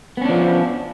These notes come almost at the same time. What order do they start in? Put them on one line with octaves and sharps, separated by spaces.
B3 C#4 D4 F3